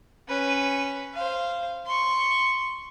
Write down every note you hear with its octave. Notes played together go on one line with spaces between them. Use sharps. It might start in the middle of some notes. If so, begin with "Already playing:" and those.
C#4 B4
C5 F5
C6 C#6